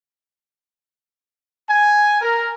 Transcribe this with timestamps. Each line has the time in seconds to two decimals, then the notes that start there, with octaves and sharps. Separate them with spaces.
1.69 G#5
2.21 A#4